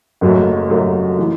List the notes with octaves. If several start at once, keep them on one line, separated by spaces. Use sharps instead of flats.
F#1 F#2 F#3 A3
F#1 F#2 F#3 A3
E3